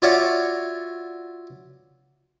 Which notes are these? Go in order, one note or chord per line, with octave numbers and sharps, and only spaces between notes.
F4 F#4 C#5 D5 E5 F5